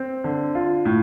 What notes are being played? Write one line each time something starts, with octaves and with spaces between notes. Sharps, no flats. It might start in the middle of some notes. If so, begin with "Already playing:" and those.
Already playing: C4
D3
F4
A2